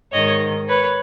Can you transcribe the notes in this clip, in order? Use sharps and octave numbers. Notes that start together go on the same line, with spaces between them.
G#2 D#3 C#5 D#5
B4 C#5